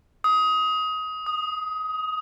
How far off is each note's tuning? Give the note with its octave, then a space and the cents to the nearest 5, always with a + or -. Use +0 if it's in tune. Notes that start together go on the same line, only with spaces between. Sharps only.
D#6 +20
D#6 -5